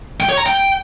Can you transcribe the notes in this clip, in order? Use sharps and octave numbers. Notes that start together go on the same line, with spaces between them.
G5
C#5
A#5
G5